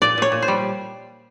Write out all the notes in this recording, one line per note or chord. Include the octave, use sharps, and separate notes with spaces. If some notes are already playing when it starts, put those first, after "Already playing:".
A#2 D5
A#2 C#5
A#2
C5
G3